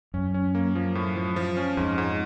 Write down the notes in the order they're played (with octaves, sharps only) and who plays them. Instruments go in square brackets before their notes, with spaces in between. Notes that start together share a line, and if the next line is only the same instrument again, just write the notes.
[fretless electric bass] F#2 [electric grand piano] C#4
[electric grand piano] C#4
A#3
F3
A2
F3
F3
C#4
[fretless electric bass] F2 [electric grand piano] G#2
[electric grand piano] G#2